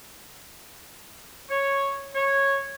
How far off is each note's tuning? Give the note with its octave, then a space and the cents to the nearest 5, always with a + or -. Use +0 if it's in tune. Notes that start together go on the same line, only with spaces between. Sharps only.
C#5 -5
C#5 -10